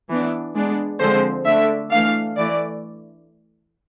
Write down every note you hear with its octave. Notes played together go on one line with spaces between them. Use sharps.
E3 B3 D4
G#3 B3 D4
D3 F3 G#3 C4 C5
D3 A3 D4 E5
E3 A3 D4 F5
E3 A3 D5